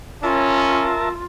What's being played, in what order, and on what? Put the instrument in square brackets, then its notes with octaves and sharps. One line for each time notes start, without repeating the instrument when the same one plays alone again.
[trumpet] C#4 [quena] F4 [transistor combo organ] A#4 E5 A5